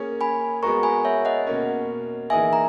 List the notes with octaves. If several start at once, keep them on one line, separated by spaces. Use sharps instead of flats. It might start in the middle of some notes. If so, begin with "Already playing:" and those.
Already playing: A#3 C#4 G#4 C#5
G#5 B5
G#3 B3 F#4 A#4 A#5 C#6
G#5 B5
C#5 E5
D#5 F#5
B2 A#3 C#4
E3 A#3 D#4 G#4 D#5 E5 G#5
A#5